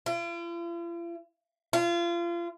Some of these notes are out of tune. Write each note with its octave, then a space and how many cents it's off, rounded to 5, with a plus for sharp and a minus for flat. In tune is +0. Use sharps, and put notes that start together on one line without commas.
F4 -45
F4 -30